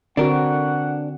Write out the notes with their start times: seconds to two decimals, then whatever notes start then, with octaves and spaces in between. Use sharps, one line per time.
0.17 D3 C4 D4 F#4 A#4 F#5